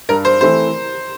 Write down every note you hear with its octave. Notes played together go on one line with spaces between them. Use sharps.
G2 A#4
C5
E3 A3 C4 E4 C5